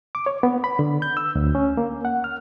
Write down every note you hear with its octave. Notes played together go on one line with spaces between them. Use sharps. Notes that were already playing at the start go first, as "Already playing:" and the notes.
D6
C#5
B3
B5
D3
G6
E6
D2
C#4
A#3
F#5
F6